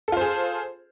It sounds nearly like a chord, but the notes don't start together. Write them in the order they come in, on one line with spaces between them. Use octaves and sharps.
A4 F4 C5 G#4